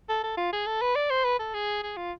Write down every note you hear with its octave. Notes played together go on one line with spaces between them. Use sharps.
A4
A4
F4
G#4
A4
B4
D5
C5
B4
A4
G#4
G#4
F4